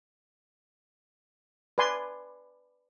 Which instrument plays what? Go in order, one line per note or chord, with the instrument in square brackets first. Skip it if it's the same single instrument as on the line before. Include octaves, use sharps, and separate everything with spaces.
[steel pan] B4 D5 G#5 C6